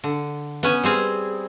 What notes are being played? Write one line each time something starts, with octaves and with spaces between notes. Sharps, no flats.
D3
B3 C#4 G#5
G3 C4 G#4